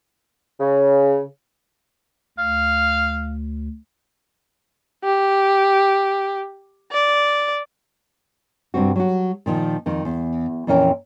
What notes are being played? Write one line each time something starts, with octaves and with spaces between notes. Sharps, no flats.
C#3
D2 F5
G4
D5
G2 C3 C4 F#4
F#3 F#4
A#2 D#3 F3
F2 D#3
E2
F2 A#2 E3 C#4 A#4 G5